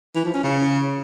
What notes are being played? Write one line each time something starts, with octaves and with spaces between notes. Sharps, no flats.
E3
F3
C#4
C#3